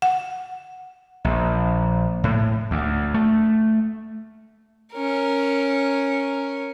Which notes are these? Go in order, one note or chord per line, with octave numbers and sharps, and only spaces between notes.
F#5
A#1
A2
D2
A3
C#4 A#4